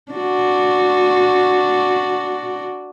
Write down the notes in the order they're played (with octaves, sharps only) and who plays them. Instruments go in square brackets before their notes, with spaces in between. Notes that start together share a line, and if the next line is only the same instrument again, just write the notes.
[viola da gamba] D4 F#4